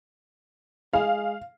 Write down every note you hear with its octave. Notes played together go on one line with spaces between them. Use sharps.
G#3 F5